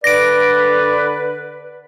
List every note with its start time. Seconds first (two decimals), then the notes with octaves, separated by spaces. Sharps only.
0.04 D3 B4 D5 A#6 D7